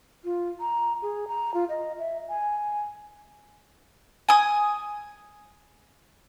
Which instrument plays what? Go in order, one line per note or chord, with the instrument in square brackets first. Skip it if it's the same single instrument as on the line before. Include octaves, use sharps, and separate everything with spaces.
[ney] F4
A#5
G#4
A#5
F4
D#5
E5
G#5
[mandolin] G#5 D#6